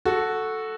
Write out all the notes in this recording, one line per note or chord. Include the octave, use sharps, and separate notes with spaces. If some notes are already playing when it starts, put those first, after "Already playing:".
F#4 A4